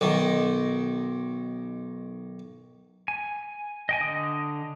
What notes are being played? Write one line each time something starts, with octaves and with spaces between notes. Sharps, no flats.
B1 D#3
G#5
D#5 G5 G#5
D3 D#5 D#6